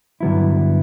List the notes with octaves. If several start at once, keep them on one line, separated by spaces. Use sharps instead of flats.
G2 D3 F#3 B3 E4